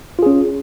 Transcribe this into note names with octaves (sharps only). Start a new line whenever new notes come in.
C#4 F4 G#4